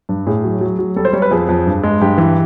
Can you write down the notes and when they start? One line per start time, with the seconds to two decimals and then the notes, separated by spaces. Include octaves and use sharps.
0.09 G2
0.26 A2 G#4
0.44 F#3
0.61 F#3
0.79 F#3
0.96 G3 A4
1.05 C5
1.13 G3 C#5
1.22 B4
1.31 F2 G#4
1.49 F2
1.67 G2
1.84 G#3
2.01 G2 G4
2.18 E3